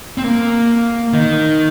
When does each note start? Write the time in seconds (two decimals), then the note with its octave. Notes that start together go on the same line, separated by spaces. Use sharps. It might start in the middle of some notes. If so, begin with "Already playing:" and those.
0.18 C4
0.24 A#3
1.13 D#3